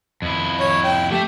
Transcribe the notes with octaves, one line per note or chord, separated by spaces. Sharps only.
F2 E4
C#5
G5
A3 G4 E5